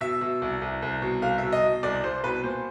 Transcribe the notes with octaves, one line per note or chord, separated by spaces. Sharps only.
B2 E5
B2
C2
C2
C2
B2
C2 F5
E5
B2
D#5
B2
C2 D5
C2 C5
B2 B4
A#2 C5